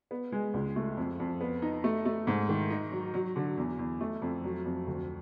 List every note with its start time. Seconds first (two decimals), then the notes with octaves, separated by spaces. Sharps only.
0.11 B3
0.32 G#3
0.54 C#2
0.76 A3
0.97 F2
1.20 F2
1.41 B3
1.62 D#4
1.84 A3
2.05 A3
2.27 G#2
2.49 D#3
2.70 D#4
2.92 F#3
3.14 F#3
3.36 D3
3.57 E2
3.79 E2
4.01 A3
4.22 F2
4.44 F#3
4.65 F2
4.87 D2